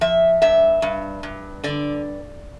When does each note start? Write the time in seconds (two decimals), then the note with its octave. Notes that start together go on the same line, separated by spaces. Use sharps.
0.01 F3 E5
0.42 G2 E5
0.82 G2
1.23 G2
1.64 D3 D5